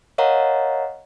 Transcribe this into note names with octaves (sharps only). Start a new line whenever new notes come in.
A#4 C#5 D#5 F5 F#5 A#5